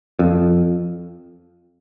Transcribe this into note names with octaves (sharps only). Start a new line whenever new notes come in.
F2